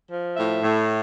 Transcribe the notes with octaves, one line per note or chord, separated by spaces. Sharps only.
F3
A2 E5
A2